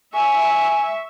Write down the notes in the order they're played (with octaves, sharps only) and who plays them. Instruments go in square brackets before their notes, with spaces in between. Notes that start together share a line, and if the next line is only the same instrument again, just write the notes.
[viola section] E5 [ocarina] G#5 [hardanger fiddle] C#6